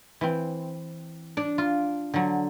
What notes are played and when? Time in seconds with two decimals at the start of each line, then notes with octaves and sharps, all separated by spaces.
0.21 E3 C4
1.37 D4
1.58 F4
2.14 D3 F#3